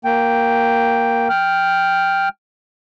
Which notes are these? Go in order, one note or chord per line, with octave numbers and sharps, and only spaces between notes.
A#3 G5
G5 F6